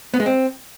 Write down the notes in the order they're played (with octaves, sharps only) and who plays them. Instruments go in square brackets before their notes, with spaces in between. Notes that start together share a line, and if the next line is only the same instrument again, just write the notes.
[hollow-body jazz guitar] B3
G#3
C4